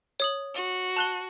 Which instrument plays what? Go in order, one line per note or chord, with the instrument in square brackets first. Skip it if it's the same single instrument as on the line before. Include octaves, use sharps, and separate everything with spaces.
[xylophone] C#5 D#6 F#7
[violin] F#4
[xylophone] A5 F#6 G7